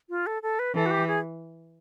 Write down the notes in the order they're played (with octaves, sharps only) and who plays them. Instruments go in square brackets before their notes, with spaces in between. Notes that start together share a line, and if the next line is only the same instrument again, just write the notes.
[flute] F4
A4
A4
B4
[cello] E3 [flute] A4
[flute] F#4
G4
G#4